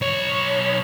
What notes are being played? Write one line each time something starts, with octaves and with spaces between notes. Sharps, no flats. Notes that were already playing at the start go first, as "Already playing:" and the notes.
B1 C#5